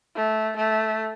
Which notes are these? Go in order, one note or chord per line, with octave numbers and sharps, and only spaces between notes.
A3
A3